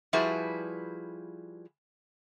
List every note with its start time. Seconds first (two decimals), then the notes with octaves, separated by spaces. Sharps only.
0.13 F3 G3 E4 F#4 G#4 B4